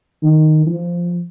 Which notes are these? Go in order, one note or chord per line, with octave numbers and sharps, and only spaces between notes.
D#3
F3